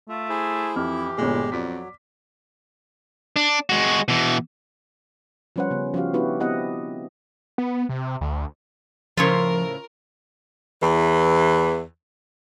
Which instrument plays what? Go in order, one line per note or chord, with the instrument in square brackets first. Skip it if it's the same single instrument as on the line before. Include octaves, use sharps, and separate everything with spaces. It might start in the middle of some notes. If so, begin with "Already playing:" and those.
[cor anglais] A3 [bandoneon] F4
[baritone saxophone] E4 [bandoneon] G#4 C5
[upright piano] F2 F6 [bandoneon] E3 [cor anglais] G4
[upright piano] G1 A#2 [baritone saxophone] G#3
[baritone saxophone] F2 [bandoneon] F#3 [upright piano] D5 D6 B6
[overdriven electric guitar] D4
G#3 F#4
B2 E3
[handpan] F3 G3 C#4 B4 C5 F#5
C#3 B3
F3 C#4 F#4 G4 F5
B3 D4 E4 F#4 G4 B4
B3 C4 E4 G4 D#5 F#5
[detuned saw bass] B3
C3
D2
[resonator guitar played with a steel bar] A2 C#3 C5 [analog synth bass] F3 [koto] F4 C#5 [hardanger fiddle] A#4
[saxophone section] E2 E3